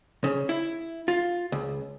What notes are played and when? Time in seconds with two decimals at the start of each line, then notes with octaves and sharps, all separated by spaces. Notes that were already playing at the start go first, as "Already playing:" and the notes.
0.24 C#3
0.49 E4
1.08 F4
1.52 C#2